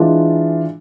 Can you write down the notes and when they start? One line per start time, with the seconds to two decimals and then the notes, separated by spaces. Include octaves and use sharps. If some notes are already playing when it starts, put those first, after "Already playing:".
Already playing: E3 G#3 D4 F4